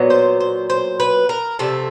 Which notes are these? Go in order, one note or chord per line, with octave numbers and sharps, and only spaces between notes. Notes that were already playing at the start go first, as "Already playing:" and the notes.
Already playing: A#2 F#3 B3
C5
C5
C5
B4
A#4
C3 F3 A3 A4